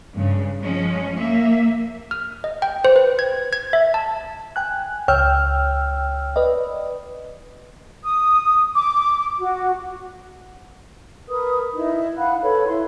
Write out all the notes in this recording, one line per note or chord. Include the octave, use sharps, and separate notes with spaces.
G2 C#3
F3 G#3 C#4
A#3 E5
F6
D#5
G5
C5
B4
G#6
G#6
E5
A5
G5 G#5 F#6
C#2 C#5 G5 E6 F6
B4 D5 D#5
D#6
D6
F#4
A#4 B4 D#6
D#4 E4
F5 F#5 B5 F#6
A4 B4 C#5 B5
E4 C6